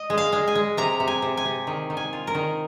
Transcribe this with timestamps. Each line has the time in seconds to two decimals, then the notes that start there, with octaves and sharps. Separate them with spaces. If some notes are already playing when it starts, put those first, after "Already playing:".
Already playing: D#5
0.10 G#3
0.18 F5
0.33 G#3
0.47 G#5
0.55 G#3
0.77 C3 A#5
1.00 C3
1.08 G#5
1.22 C3
1.37 G#5
1.45 C3
1.67 D#3
1.90 D#3
1.97 G#5
2.13 F4
2.27 A#4
2.35 D#3